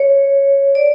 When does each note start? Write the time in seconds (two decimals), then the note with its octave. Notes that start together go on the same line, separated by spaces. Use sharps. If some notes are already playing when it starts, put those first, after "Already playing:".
Already playing: C#5
0.75 D5